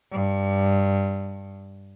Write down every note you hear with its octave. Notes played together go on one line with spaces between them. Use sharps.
G2